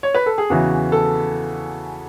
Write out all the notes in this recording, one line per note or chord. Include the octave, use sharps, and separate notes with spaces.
C#5
B4
A4
G#4
E2 C#3 E3 F#4
A4